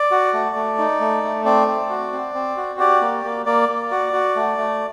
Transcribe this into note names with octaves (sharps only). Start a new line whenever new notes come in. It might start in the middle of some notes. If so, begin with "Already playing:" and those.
Already playing: D5
F#4
A3
A3
D#4
A3
A3
C4 D5
C4
F#4
C4
C4
F#4
G4 D5
A#3
A#3
A#3 D5
A#3
F#4
F#4
A3
A3